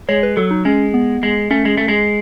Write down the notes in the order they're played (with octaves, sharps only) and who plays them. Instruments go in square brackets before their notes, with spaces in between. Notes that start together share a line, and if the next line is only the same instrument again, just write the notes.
[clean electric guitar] G#3 [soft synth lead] C#5
[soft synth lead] B4
[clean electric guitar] F#3 [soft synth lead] A4
[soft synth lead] D#4
[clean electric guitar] G#3 [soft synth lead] C#4
[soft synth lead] B3
[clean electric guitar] G#3
[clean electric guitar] A3 [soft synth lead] C#4
[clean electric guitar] G#3
A3
G#3